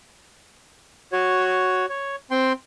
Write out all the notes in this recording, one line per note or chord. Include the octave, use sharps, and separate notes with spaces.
F#4 C#5
C#5
C4 G5 C6